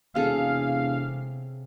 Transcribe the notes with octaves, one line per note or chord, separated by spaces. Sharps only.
E1 C3 C#4 G#4 A4 F5